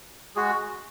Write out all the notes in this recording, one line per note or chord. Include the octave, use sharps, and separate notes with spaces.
G#3 F#4 G#4